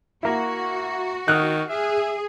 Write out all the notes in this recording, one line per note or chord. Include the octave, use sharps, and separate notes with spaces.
A#3 E4 F#4
D#3 D#6 F6 F#6
G#4 E5